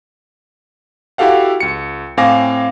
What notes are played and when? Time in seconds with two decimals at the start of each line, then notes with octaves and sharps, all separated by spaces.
1.18 E4 F#4 G4 A4 F5 F#5
1.60 C#2 C#7
2.17 A2 C4 F5 G#5 D6 A#6